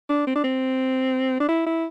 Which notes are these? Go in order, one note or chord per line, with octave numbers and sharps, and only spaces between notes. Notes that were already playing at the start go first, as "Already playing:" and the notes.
D4
C4
D4
C4
D4
E4
E4